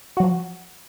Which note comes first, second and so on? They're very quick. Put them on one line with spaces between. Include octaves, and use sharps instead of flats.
F#4 F#3 F3